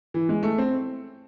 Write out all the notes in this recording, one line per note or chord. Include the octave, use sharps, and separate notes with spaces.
E3
G#3
A3
C4